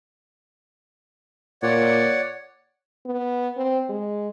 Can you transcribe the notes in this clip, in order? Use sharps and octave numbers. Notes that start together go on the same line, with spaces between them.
A#2 C#5 D5 F#5
B3
C4
G#3